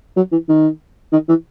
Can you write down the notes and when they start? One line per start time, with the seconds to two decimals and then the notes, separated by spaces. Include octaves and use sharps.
0.17 F#3
0.32 E3
0.49 D#3
1.12 D#3
1.29 E3